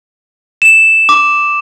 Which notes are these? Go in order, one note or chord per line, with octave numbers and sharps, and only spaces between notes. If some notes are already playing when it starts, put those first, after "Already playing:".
E7
D6